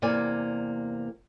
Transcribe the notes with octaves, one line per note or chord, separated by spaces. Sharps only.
E2 C3 A#3 D5 G#5